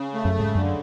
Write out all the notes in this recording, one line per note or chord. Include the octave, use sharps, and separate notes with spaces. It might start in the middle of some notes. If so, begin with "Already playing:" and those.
Already playing: C#3
A3
F#2
C#3
G#2
F#2 D3